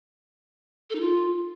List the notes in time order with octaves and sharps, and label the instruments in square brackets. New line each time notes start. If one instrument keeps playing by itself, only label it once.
[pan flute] A4
D#4
F4